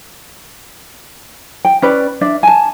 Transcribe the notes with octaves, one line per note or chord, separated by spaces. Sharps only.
G5
C#4 B4 D5
D4 D5 E5
G#5 A5